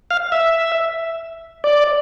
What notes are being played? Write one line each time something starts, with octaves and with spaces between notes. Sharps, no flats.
F5
E5
D5